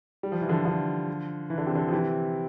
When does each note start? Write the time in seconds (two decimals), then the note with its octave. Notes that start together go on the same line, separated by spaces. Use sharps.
0.23 G3
0.32 F3
0.41 E3
0.49 D3 F3
0.65 D3 F3
1.50 E3
1.58 D3
1.67 C3
1.75 D3
1.88 F3
1.92 C3 E3